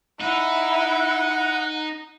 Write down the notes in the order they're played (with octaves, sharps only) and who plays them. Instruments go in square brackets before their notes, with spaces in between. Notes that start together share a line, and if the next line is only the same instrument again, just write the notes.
[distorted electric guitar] D#4 [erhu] E4 [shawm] F#5